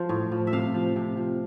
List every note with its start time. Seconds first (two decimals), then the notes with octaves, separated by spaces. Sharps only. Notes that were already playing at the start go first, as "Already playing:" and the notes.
Already playing: F3 C5
0.09 A2
0.32 F3
0.47 E5
0.53 C3 F5
0.74 F3
0.96 C3
1.17 F3